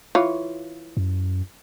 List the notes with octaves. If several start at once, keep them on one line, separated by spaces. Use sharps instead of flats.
E3 F4 C#5
F#2